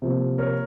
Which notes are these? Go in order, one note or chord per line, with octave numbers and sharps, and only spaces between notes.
C3 F3 A#3
A#4 C#5